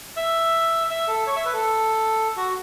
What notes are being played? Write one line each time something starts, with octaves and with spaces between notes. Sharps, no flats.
E5
E5
A4
C#5
E5
B4
A4
F#4